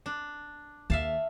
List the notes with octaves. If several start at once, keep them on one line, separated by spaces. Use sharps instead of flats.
D4
D#2 D4 E5 F5 A5